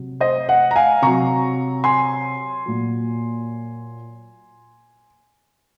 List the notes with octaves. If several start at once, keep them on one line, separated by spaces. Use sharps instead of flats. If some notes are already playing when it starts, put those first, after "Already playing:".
Already playing: C3 F#3
C5 D#5
D#5 F#5
A#5
F5 G#5
C3 F#3 A#5 C#6
G#5 C6
A#2 F#3